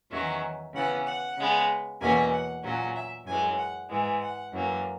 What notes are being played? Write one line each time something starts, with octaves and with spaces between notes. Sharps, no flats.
E2 D#3 F#3 C#4 E5
C#3 E3 B3 F#5
F#5
C#3 G#3 B3
E2 B2 A#3 C#4 G#5
F#5
A#2 F#3 C#4
E5
F#2 E3 G#3 G#5
F#5
G#2 E3 G#3
F#5
F#2 E3 A#3